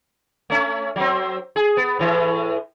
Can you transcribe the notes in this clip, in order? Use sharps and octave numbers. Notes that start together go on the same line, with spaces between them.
A3 C#4
F#3 C4
G#4
B3
A2 E3